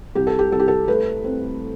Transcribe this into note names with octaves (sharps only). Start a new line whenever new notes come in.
C2 G4
A4
G4
C2 A4
G4
A4
A3 B4
C4